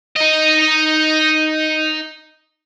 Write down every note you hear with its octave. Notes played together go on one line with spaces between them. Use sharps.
D#4 D#5